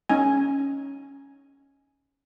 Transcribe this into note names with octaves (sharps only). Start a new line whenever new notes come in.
C#4 D#4 G#5